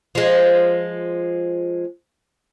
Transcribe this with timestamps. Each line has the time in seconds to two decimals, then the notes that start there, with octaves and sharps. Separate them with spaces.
0.15 F3 G#3